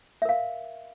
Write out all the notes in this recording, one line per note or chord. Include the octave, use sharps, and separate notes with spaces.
A#4 E5 F5